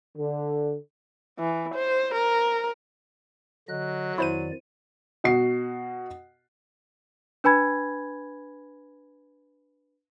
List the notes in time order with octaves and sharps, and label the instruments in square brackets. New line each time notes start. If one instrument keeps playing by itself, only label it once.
[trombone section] D3
[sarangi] E3
C5
A#4
[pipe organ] D3 D#5 F#6 [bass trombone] F#3
[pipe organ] F2 D#3 D5 [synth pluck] E4 C5 D#7
[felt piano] B2 F#4 C7
[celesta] D4 B4 G#5 B5 G#6